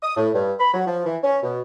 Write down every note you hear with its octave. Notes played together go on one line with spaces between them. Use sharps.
D#6
A2
G2
B5
F#3
F3
E3
C#4
B2